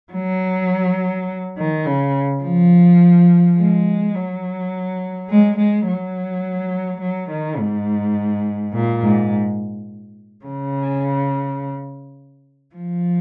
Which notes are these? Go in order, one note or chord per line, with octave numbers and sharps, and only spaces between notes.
F#3
D#3
C#3
F3
G#3
F#3
G#3
G#3
F#3
F#3
D#3
G#2
A#2
G#2
C#3
F3